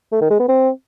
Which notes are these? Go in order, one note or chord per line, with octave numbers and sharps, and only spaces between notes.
A3
D#3
G#3
B3
C4